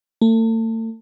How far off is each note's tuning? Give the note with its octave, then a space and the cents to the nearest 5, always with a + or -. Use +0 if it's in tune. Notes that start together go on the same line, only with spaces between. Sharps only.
A3 +40